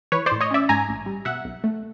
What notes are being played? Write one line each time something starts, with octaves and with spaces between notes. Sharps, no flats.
E3 B4 C#5
C5 D5
A2
C#5 D#5
C#4 D5 E5
G#2 G#5 A#5
A1
G3
B2 E5 F#5
B1
A3